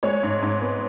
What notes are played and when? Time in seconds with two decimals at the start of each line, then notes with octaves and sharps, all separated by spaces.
0.03 G#3 C#5
0.23 G#2
0.42 G#2
0.62 B3